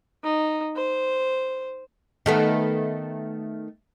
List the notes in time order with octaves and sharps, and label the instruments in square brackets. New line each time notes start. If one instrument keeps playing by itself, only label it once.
[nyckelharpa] D#4
C5
[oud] D#3 A3 B3